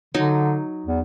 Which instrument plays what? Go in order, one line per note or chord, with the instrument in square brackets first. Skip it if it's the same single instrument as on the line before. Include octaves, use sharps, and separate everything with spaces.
[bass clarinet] D3 [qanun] F#3 D#4
[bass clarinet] E2